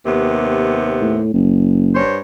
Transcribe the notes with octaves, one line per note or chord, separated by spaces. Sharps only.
D#2 C3 B3
A2
F#1
G2 C5 C#5